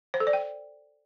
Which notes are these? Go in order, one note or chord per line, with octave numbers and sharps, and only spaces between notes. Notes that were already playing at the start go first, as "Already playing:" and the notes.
C5
A4
D5
G5